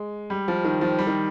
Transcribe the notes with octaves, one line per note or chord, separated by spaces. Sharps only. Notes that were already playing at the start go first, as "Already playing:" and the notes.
Already playing: G#3
G3
F3
D#3
F3
G3
D#3